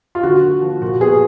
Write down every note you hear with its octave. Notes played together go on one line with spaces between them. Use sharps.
F4
D3 F#4
A#3
F3
A#2 F#4
B3 G#4